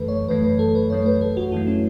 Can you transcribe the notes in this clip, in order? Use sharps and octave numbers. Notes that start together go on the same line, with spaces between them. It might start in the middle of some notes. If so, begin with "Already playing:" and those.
Already playing: F#2 E3 A3 A4 B4
C#5
F#2 E3 A3 B4
B4
A4
B4
F#2 E3 A3 C#5
B4
A4
F#4
F#2 E3 A3 E4
C#4